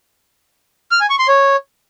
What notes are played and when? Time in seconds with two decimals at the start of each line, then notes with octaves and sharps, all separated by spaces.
0.91 F6
1.01 G#5
1.10 C#6
1.19 C6
1.28 C#5